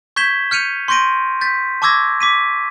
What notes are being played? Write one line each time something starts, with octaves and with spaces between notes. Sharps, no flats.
C#6 G6 G#6 B6 E7 G7
F6 G6 C#7 D#7 F7
C6 C#6 G6 A#6 D7 D#7
G6 A6 B6
A5 C#6 D6 E6 G#6 A#6
D6 B6 D#7